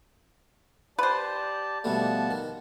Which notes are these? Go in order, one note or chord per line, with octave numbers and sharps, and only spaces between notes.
G4 B4 C5 D5 A5
B2 F3 G3 A3 F#5 A5
D#3